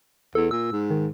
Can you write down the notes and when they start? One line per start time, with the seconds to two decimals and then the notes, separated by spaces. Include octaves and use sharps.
0.35 E2 A4
0.51 A#2 E6
0.72 G#2
0.90 D#3